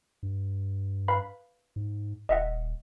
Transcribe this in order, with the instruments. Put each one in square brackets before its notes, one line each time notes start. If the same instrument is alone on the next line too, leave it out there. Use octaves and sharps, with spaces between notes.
[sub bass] G2
[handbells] B4 F5 B5
[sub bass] G#2
[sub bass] D#1 [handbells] D#5 E5 F#5